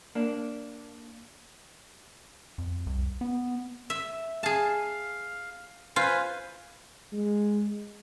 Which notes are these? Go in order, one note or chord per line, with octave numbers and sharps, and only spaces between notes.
A#3 D4
F2
C2
B3
E5
G#4 F5 A5
F4 B4 C5 G#5
G#3